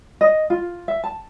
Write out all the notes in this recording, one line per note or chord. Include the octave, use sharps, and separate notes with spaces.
D#5
F4
E5
A5